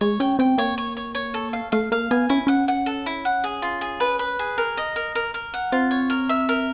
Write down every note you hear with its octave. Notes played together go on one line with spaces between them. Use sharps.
G#3 C#5
C#4 G5
C4 G5
A#3 C#5
C#5
C#5
C#5
A4
F5
A3 F5
A#3 F5
B3 G#5
C#4 E4
C#4 F#5
F#5
A4
E4
F#5
G#4
F4
G#4
B4
B4
G#4
A#4
D#5
A#4
A#4
A#4
F#5
C4 F4
C#5
A#4
E5
A#4